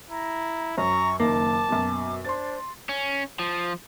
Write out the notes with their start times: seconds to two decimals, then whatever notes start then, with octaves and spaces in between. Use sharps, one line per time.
0.10 E4 A#5
0.77 F#2 F#3 C#5 A#5 C#6
1.20 F#1 D#3 A#3 A5 D6
1.69 F#2 B2
2.25 D4 C5 C6 A6
2.89 C#4
3.39 F3